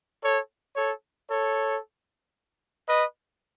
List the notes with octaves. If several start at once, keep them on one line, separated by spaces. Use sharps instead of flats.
A4 C#5
A4 C#5
A4 C#5
B4 D#5